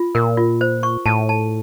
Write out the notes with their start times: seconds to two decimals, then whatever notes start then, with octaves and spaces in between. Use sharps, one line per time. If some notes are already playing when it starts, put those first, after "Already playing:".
Already playing: F4
0.15 A#2 A#4
0.37 F4
0.61 C5
0.83 C#6
1.06 A2 A5
1.29 A5